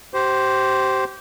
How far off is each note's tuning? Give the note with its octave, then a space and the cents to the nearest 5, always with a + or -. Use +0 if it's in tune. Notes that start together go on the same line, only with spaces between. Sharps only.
G4 -30 C5 +0